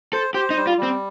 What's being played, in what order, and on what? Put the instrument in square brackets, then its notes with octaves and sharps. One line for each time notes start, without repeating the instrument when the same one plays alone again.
[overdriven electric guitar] A4 [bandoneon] C5
[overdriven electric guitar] G4 [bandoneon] C5
[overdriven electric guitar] D#4
[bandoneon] G3
[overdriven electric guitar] F4
[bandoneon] G3
[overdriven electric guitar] C4